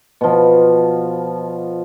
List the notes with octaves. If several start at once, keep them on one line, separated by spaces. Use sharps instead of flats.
B2 F3